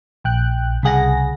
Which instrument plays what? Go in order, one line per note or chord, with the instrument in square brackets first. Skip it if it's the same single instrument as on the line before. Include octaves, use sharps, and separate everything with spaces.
[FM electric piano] A#1 G5 F#6
[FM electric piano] C2 G#4 A#6 [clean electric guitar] C#3 F#5